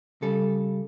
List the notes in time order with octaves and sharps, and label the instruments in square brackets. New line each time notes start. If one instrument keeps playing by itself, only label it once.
[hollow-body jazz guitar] C#3 G3 A4